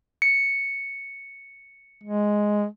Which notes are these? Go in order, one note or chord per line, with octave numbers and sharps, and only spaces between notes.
C#7
G#3